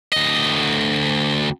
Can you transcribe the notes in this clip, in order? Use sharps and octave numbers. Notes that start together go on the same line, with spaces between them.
D2 D#5